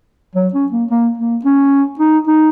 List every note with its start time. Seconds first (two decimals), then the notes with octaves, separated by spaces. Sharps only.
0.36 F#3
0.53 C#4
0.72 A#3
0.91 A#3
1.18 A#3
1.45 C#4
1.99 D#4
2.27 D#4